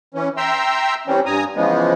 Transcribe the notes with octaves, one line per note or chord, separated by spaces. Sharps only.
E3 C#4
E5 G5 A#5 C6 E6
E3 G3 C4 C#4
G2 G#5 A#5 D#6
C#3 E3 F3 G#3 B3